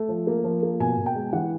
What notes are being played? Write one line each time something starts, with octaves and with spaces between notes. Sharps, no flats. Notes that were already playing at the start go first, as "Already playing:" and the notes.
Already playing: A3
F3
A#3
F3
A#3
B2 G#5
B2
G5
G#3
E3 F#5